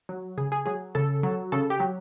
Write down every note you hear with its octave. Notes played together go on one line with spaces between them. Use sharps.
F#3
C#3 G#4
G#4
F#3 G#4
C#3 A4
F#3
C#3 A4
G4
F#3